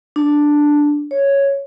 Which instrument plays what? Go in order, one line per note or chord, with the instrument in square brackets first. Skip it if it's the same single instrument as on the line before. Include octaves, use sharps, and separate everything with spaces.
[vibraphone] D4
C#5